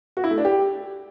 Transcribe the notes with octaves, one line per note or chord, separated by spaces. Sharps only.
F#4
E4
A3
D4
G4